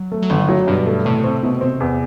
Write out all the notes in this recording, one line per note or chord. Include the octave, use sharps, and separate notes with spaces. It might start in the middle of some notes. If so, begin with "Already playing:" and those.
Already playing: F#3
A3
F#3
G1 E3
F#3
G2 B2
A3
A2 C3
C4
B2
C4
E2